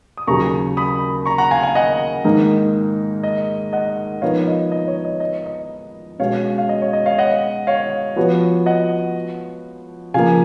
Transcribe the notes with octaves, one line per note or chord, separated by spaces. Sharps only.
D#6
D#2 C#3 F#3 A#5 C#6
B5 D#6
A#5 C#6
F#5 A#5
F5 G#5
F5 G#5
D#5 F#5
G#2 D#3 A#3 D#4 A#4
D#5
D#5 F#5
F3 B3 D#4 A#4 C#5 F5
D#5
D#5
C#5
D#5
D#5
D#5
B2 G#3 C#4 F#4 C#5 F5
F5
D#5
C#5
D#5
C#5 F5
D#5 F#5
C#5 F5
F3 B3 F#4 C#5
D#5 F#5
C#3 F3 A#3 F5 G#5